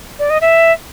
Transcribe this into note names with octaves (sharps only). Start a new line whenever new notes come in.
D5
D#5
E5